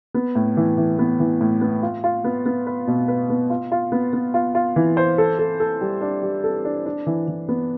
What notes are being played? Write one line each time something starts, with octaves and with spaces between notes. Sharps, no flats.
B3
A2
E3
E3
B3
E3
A2
B3
F4
F4
B3
B3
B4
B2
B4
B3
F4
F4
B3
B3
F4
F4
E3
C5
A4
A4
A4
G3
D4
G3
A4
D4
D4
E3
E3
B3